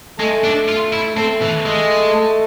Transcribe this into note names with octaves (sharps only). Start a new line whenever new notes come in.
G#3 A3 A4
D4
F4
E4
A3 C4 A4
E3
G#3
A3 A4